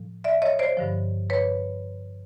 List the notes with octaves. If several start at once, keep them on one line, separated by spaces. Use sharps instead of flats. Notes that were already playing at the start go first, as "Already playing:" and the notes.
Already playing: A2 F3
D5 E5
C#5 D#5
C5 D5
G2 D3 F3
B4 C#5